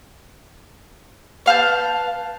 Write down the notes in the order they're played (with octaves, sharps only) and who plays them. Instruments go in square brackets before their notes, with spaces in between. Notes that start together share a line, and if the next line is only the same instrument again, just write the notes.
[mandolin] B4 F5 A5 G6